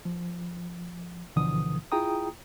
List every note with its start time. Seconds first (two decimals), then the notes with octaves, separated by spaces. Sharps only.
0.05 F3
1.36 D2 B2 D3 E3 F3 D#6
1.92 E4 F4 G#4 G5 A#5 D#6